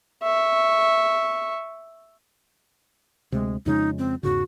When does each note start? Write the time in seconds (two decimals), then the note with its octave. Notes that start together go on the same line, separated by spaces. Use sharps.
0.23 E5 C#6
3.32 D2 C3 G#3
3.66 F2 C#3 G#3 D#4
3.98 C4
4.23 E2 G#2 C#3 F#4